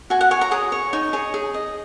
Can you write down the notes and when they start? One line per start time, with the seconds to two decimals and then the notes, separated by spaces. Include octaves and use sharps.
0.10 F#4 G#5
0.21 F#5
0.31 C#5 G#5
0.41 A#5
0.51 G#4 D#6
0.72 C#5
0.93 D#4 C#6
1.13 G#4 C#5
1.34 G#4
1.54 D#5